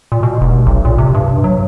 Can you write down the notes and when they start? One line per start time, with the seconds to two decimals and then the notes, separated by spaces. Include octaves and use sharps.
0.12 A#2
0.23 B2
0.41 F1
0.67 B1
0.85 A#2
0.98 C3
1.15 G2
1.44 F#3